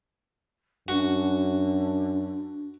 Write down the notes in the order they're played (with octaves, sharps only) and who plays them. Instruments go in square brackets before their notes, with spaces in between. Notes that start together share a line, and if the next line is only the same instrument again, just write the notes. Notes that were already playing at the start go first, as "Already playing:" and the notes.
[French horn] F#2 [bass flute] D4 [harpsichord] F#4